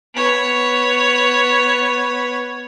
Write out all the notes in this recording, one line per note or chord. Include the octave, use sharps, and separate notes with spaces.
B3 C#5